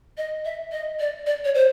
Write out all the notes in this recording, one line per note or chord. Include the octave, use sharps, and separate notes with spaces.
D#5
E5
D#5
D5
D5
C#5
C5